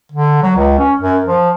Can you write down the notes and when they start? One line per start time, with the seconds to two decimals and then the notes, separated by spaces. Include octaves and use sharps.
0.12 D3
0.43 F#3
0.57 C#2
0.79 C#4
1.01 F#2
1.25 F3